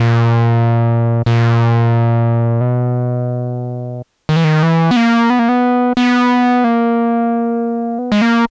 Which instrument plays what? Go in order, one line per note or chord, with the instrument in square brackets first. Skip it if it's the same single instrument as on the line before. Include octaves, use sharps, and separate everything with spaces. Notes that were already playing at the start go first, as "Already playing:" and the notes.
Already playing: [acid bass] A#2
A#2
B2
D#3
E3
D#3
E3
B3
A#3
B3
A#3
B3
B3
A#3
B3
G#3
A#3